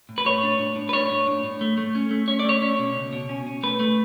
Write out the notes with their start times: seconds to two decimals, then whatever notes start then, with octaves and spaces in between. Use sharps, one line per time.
0.09 A2
0.18 B4
0.25 A2 C#5
0.43 D4
0.59 A2
0.76 A2
0.89 B4
0.93 D4 C#5
1.10 A2
1.27 A2
1.44 A2
1.61 A3
1.78 A3
1.95 C#4
2.11 A3
2.28 C#4 C#5
2.39 D5
2.45 A3 C#5
2.62 C#4
2.79 B2
2.95 C#2
3.13 B2
3.29 C#4
3.47 C#4
3.63 A3 B4
3.80 A3